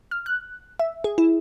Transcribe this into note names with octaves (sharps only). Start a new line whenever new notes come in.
F6
F#6
E5
G#4
E4